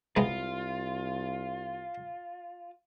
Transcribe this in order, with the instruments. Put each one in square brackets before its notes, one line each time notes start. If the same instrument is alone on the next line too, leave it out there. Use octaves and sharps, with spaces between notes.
[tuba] C2 [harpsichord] C3 G#3 B3 [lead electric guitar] F4